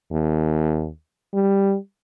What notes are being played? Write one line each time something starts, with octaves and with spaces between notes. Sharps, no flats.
D#2
G3